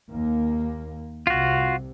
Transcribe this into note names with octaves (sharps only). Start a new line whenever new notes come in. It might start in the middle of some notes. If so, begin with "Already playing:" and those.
D#2 A#3
C2 C3 F4 F#4